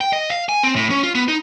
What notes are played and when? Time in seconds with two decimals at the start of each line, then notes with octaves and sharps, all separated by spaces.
0.01 G5
0.13 D#5
0.30 F5
0.49 G#5
0.63 C4
0.76 A2
0.90 C#4
1.03 F4
1.15 B3
1.28 D#4